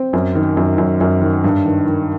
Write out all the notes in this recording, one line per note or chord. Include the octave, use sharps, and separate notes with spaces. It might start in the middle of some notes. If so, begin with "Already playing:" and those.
Already playing: C4
F#2
D#3
F#2
F#2
F#2
D#3
G2
D#3
D#3